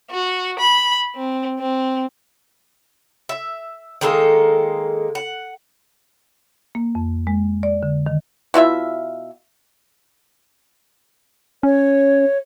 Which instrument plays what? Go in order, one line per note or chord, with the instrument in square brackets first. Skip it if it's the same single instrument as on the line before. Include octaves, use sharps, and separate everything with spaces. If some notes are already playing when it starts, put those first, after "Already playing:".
[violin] F#4
B5
C4
C4
[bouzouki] E5
D#3 G#3 A#3 A4
F#5
[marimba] A#3
F2
G#3
D5
D3
D#3
[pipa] B2 E4 F4 E5
[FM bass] C#4 [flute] C#5